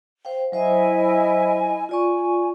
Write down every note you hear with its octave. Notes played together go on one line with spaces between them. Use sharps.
C5 F5 G5
F#3 E4 C5 D#5 E5 G#5
F4 D5 G#5 C#6